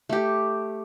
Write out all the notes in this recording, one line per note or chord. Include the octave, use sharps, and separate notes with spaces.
A3 G4